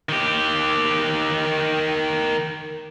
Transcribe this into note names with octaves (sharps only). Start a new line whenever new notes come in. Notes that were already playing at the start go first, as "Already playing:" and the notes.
D#3 G4